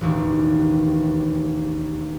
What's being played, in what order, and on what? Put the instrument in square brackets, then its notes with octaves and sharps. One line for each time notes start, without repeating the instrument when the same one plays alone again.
[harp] E1 A1 D#2